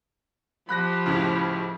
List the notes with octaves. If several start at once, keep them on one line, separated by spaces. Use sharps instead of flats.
F3 G4 B5 F#6 A#6
C#2 A2 C#3